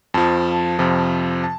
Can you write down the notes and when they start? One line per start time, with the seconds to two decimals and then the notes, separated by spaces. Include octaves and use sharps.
0.14 F2 F3 A5
0.79 F2 C3 F3
1.44 A5